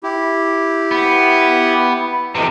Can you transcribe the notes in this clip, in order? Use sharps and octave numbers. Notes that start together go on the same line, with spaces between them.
E4 G4
B3
F2 C3 D#3 E3